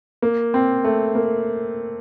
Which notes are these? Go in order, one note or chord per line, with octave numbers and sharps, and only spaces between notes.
A#3
C4
A3
A#3